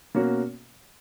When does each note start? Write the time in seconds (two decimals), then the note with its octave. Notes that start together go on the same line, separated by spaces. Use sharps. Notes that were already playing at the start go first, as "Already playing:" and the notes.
0.15 B2 A#3 C#4 F#4